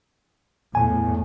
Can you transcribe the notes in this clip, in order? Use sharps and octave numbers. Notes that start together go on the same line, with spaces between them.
E2 A2 G#5